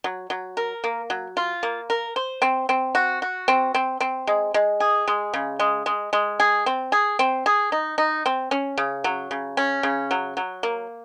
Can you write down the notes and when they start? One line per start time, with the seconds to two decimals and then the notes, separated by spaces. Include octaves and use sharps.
0.04 F#3
0.30 F#3
0.57 A#4
0.84 A#3
1.10 F#3
1.37 F4
1.63 A#3
1.90 A#4
2.16 C5
2.42 C4
2.69 C4
2.95 F#4
3.22 F#4
3.48 C4
3.74 C4
4.00 C4
4.27 G#3
4.54 G#3
4.80 G#4
5.08 G#3
5.34 C#3
5.59 G#3
5.86 G#3
6.13 G#3
6.40 G#4
6.66 C4
6.92 G#4
7.19 C4
7.46 G#4
7.72 D#4
7.98 D#4
8.26 C4
8.51 C#4
8.78 C#3
9.04 F#3
9.31 C#3
9.57 C#4
9.83 C#3
10.11 F#3
10.37 F#3
10.63 A#3